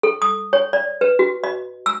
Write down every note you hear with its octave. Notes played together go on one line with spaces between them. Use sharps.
A4
D#6
C#5
D5
B4
F#4
D#5
E6